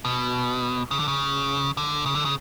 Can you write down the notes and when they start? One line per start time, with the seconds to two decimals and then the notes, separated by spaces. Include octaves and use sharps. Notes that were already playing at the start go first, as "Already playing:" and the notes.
0.05 B2
0.91 C#3
0.99 D3
1.08 C#3
1.77 D3
2.06 C#3
2.15 D3
2.25 C#3